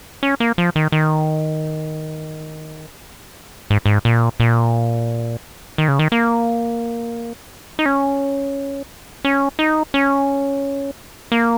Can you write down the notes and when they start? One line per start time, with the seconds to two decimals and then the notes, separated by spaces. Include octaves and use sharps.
0.23 C#4
0.40 A#3
0.58 F3
0.76 D#3
0.92 D#3
3.70 G#2
3.86 G#2
4.05 A#2
4.40 A#2
5.78 D#3
5.88 C#3
5.99 D#3
6.12 A#3
7.79 D#4
7.86 C#4
9.25 C#4
9.59 D#4
9.94 C#4
11.32 A#3